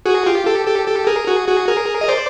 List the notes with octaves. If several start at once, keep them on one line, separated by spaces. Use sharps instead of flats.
F#4 G#4
F4 G4
G4 A4
G4 A4
G4 A4
G#4 A#4
F#4 G#4
F#4 G#4
G#4 A#4
D#5
C5 D5